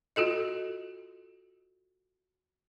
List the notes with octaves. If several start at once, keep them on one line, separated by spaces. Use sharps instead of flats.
F4 F#4 A4 D#5